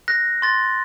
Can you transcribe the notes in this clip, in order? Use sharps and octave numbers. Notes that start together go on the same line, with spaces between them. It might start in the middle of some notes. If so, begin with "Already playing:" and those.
F#6 A#6
C6 A6